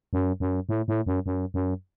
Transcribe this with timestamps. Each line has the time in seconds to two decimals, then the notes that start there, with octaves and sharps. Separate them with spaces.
0.13 F#2
0.40 F#2
0.69 A2
0.88 A2
1.06 F#2
1.26 F#2
1.54 F#2